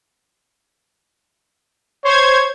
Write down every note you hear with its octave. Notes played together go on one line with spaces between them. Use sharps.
C5 C#5 G#6